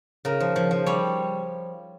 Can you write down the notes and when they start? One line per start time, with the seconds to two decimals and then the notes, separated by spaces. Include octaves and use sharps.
0.25 C#3 A#4
0.40 F3
0.56 F3
0.71 F3
0.86 G3 C#5